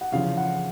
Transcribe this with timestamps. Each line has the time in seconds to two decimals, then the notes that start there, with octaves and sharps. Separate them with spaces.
0.01 F#5
0.12 E2 C#3 F3 F5
0.37 F#5